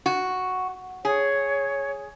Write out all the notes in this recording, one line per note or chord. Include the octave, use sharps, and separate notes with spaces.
F#4
G#4 C#5